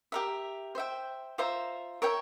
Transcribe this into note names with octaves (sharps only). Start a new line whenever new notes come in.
G4 A#4 E5
C5 E5 G5
F4 C5 E5 A#5
A#4 C#5 E5 G5